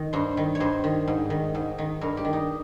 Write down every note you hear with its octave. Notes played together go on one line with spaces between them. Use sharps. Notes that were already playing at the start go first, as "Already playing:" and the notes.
Already playing: D#3
G2 C5
D#3
C#5
G2 C5
D#3
G#2
D#3
G#2
D#3
G2 A#4
G4
D#3
D#4